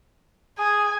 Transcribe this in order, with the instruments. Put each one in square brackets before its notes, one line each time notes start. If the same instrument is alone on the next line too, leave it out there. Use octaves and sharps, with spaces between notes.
[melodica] G#4 [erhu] G#5